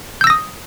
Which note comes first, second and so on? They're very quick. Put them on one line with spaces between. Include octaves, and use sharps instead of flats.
G6 E6 A#6 D#6